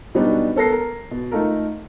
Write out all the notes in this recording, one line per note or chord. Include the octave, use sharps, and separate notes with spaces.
B2 F#3 G3 B3 D4 D#4
B3 A4 A#4 A#6 C7
A#4
B2
A3 D#4 F4 A4 A#4